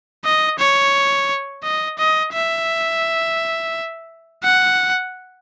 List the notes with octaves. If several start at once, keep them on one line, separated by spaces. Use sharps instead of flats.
D#5
C#5
D#5
D#5
E5
F#5